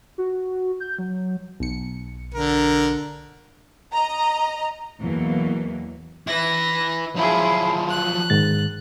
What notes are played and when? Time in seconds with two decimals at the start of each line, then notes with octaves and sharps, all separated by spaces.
0.18 F#4
0.80 G6
0.99 F#3
1.60 B1 C#7
2.34 D3 A#4
3.94 D#5 A#5
5.01 E2 B2 E3 F#3 A#3
6.27 E4 B4 A#6
7.16 F3 F#3 E4 G#4
7.90 F#6
8.30 G#2 D#3 A6